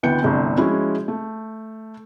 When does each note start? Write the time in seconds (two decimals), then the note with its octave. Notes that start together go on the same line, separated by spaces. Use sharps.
0.03 D2 E3 B3 G5 G6 C#7
0.23 G1 C2 A3
0.57 F3 G#3 C#4 E4 F#4
1.08 A3